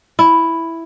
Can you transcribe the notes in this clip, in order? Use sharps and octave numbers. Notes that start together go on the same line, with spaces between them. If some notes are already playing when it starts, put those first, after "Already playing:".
E4